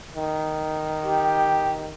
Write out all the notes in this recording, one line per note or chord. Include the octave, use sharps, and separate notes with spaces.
D#3
G4